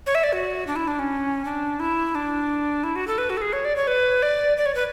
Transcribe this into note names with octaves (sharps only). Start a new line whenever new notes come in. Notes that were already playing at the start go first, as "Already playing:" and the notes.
C#5
E5
D5
F#4
D4
E4
D4
C#4
D4
E4
D4
E4
F#4
A4
B4
F#4
A4
G#4
C#5
D5
C#5
B4
D5
D5
C#5
B4